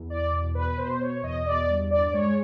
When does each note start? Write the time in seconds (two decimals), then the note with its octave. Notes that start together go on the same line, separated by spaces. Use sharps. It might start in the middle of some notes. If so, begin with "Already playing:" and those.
Already playing: E2
0.10 D5
0.32 B2
0.55 B4
0.78 B2 C5
1.01 C#5
1.23 E2 D#5
1.46 D5
1.69 G2
1.91 D5
2.04 D5
2.13 G#3 C#5